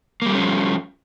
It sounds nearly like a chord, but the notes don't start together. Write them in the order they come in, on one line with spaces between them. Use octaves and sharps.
A#3 G3 A3 C#4 F3